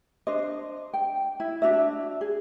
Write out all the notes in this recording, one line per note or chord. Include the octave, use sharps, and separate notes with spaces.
D4 C5 D#5
G5
E4
D4 F#4 E5
G#4